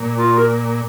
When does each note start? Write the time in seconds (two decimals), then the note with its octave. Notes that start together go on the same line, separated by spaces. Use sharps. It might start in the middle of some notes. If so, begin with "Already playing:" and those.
Already playing: A#2
0.17 F4
0.38 A#4